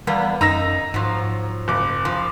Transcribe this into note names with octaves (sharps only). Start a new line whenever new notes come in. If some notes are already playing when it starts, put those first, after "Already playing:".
E2 G3 A#3 B3
F#2 D#4 A#5 E6 A#6
G#2 F3 F#3
F#1 D6
F3